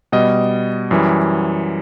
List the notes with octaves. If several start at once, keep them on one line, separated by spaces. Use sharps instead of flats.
B2 G3 D#5
F#2 E3 G3